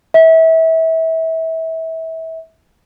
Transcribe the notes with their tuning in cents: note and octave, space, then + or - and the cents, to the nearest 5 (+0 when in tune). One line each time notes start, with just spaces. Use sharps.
E5 -25